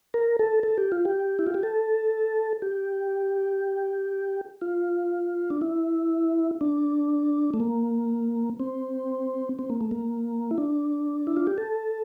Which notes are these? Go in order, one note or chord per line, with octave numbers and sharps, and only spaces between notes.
A#4
A4
A4
G4
F4
G4
E4
F4
G4
A4
G4
F4
D4
E4
D4
A3
A#3
C4
C4
A#3
A3
A#3
E4
D4
E4
F4
G4
A4